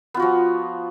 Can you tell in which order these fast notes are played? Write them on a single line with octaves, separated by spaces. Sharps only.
B3 F4 F#4 F3